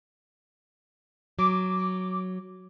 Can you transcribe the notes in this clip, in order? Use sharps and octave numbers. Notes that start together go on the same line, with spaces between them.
F#3 D6